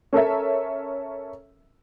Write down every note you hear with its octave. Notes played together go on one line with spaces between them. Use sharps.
C#4 A4 A#4 E5